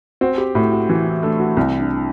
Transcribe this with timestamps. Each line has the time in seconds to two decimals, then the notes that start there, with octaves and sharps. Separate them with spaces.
0.21 C4 F#4
0.38 G4
0.55 A2 F#4
0.71 F#4
0.89 E3 F#4
1.06 E4
1.23 A3 D4
1.40 F#4
1.57 C2 E4
1.79 D4